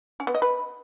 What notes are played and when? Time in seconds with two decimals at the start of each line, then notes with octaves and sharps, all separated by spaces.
0.20 C#4
0.27 B3
0.35 D#5
0.42 B4